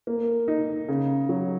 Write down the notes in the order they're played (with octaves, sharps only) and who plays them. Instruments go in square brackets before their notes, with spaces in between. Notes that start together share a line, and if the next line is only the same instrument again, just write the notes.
[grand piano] A#3
D#4
C#3
F#3